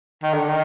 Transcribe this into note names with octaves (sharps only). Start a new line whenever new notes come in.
D#3
D3
D#3